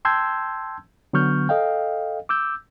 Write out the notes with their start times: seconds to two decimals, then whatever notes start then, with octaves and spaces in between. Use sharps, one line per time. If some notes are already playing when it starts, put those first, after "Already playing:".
0.05 G5 A5 C6 E6 G6 G#6
1.13 D3 F#3 B3 C#6 F6 G6
1.49 A4 D#5 F5 G5
2.29 D6 E6 G6